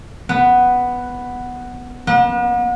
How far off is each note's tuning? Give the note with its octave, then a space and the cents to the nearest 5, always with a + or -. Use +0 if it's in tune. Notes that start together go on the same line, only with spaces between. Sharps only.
B3 +0
B3 -40